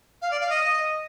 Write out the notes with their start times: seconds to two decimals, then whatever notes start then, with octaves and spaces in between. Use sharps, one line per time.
0.22 F5
0.31 D5
0.40 F5
0.50 D#5